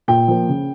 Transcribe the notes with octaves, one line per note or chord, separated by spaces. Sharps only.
A#2 G5
F3 A#3
C#3